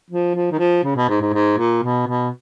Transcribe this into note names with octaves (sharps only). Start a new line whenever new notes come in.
F3
F3
D#3
F3
C#3
B2
G#2
G#2
G#2
A#2
B2
B2